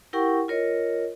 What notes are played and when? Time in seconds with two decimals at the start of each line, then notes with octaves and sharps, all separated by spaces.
0.13 E4 G4 A#4 F#5 G5 C#6
0.48 F4 A#4 C#5 D#5